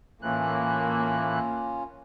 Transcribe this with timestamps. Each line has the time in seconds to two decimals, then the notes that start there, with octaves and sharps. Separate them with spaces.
0.22 A2 E3 A#3 C#4 F4 F#6